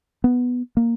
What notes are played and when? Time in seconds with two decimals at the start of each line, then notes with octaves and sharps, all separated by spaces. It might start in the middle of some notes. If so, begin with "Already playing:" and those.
0.24 B3
0.77 A#3